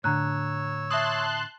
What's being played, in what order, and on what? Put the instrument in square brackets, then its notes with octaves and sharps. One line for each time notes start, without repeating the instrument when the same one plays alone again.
[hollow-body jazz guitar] A2 D3 [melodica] C#5 E6 [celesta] A#5 F#6
[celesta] E5 D#6 [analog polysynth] A5 C6 F#6